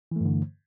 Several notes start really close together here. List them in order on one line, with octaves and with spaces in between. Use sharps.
E3 A3 G2 D3